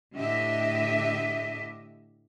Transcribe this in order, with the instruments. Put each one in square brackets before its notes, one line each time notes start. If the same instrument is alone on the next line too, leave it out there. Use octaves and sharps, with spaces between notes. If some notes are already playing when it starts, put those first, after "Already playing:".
[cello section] A2 D3 G4 D#5 E5